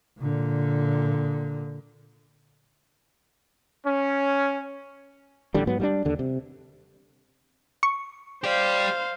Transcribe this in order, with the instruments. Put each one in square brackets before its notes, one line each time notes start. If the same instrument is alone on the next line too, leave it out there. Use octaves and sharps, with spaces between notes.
[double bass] A#2 D3
[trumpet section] C#4
[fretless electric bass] A1 D3 G3
G#2 F#3 B3
G3 A#3 D4
D#2 D3
C3
[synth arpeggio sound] C#6
[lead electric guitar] G4 D5 [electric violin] C5 F5